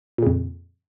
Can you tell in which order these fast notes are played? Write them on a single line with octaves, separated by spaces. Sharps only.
A#2 C#3 F2